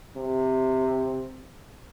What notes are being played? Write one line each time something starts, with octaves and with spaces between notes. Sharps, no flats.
C3